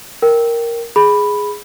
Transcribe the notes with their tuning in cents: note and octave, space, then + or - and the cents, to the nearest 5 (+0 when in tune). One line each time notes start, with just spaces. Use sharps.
A#4 +0 G5 -5
G#4 +0 B5 +0